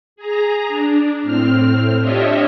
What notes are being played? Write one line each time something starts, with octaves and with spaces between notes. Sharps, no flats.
G#4 A#5
D4
A2 C4 F6
D4 F4 G4 C#5 D#5 E5